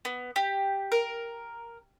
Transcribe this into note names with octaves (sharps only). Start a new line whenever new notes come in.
B3
G4
A#4